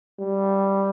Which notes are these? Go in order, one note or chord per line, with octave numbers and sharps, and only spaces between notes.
G3